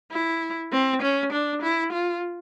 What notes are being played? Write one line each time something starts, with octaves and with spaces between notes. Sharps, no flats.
E4
C4
C#4
D4
E4
F4